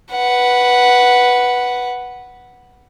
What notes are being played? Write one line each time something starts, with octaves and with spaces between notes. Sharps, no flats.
B4 F#5